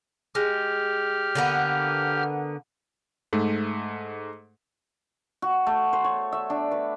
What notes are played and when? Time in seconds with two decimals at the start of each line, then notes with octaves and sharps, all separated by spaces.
0.35 G#3 G4 F6
1.35 D3 A#3 B3
3.33 G#2 A3
5.42 F#4
5.67 A3
5.93 C5
6.04 C#5
6.32 E5
6.50 D4
6.71 B4